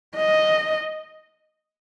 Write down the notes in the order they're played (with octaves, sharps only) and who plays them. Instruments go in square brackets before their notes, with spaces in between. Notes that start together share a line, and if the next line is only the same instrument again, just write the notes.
[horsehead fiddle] D#5